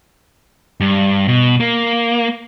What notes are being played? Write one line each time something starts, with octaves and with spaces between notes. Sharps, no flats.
G2
B2
A#3